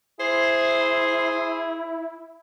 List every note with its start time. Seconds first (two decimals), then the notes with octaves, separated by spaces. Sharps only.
0.20 E4 G#4 C5